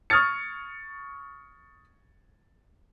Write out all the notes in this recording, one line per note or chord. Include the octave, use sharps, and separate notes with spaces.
C#6 D#6 F6 G#6 A6 C#7